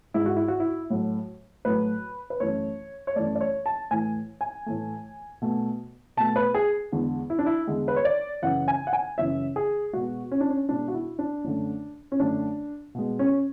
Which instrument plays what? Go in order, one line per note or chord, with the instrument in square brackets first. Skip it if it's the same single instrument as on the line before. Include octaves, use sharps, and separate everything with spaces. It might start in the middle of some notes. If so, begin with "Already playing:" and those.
[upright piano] G#2 G#3 E4
F#4
E4
F#4
E4
A2 F#3 A3
A2 F#3 A3 B4
B4
F#2 E3 A3 C#5
C#5
F#2 E3 A3 D5
D5
C#5
A5
A2 E3 A3 G#5
G#5
A2 E3 A3
B2 A3
B2 A3 A5
B4
G#4
E2 D3 G#3
E4
D4
E4
E2 D3 G#3
B4
C#5
D5
F#2 C#3 E3 F#5
G#5
F#5
G#5
F#2 C#3 E3 E5
G#4
B2 G#3 F#4
C#4
D4
C#4
B2 G#3 D4
F#4
E4
D4
F#2 D3 A3
C#4
F#2 D3 A3 D4
B2 G#3
C#4